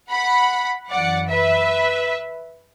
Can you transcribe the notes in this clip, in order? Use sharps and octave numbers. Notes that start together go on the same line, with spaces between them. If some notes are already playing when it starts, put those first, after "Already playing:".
F#5 B5
F#2 E3 D5 F#5
B4 E5